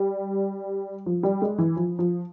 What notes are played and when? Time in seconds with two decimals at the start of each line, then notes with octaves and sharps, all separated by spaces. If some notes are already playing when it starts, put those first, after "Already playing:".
Already playing: G3
1.06 F3
1.23 G3
1.42 G#3
1.58 E3
1.76 F3
1.99 F3